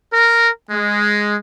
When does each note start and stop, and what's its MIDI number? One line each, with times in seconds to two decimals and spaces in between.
0.12 0.49 70
0.71 1.36 56